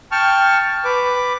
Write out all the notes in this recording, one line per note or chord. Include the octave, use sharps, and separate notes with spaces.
G5 A5 C#6 F6
B4 D6